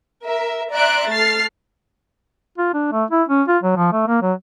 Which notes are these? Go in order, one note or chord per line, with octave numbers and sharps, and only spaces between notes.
A#4 E5
D5 E5 A#5 C6 F#6 D7
A3 F6 A6 C7
F4
D4
A3
E4
C#4
F4
F#3
F3
A3
A#3
F#3